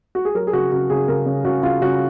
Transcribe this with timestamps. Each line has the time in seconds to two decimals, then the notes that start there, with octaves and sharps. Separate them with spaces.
0.15 F#4
0.25 G#4
0.35 F#3 A#4
0.47 G#4
0.53 C#3 F#4
0.72 C#3 F#4
0.90 C#3 G#4
1.08 C#3 A#4
1.26 C#3
1.45 C#3 F#4
1.63 C#3 F4
1.81 C#3 F#4